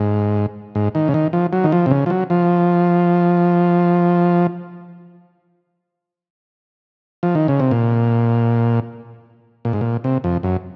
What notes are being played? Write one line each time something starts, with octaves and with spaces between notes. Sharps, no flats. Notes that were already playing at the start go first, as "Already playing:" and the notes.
Already playing: G#2
G#2
D#3
C#3
D#3
F3
F#3
D#3
F3
C3
C#3
F3
F#3
F3
F3
D#3
C#3
C3
A#2
A#2
G#2
A#2
C3
F2
F#2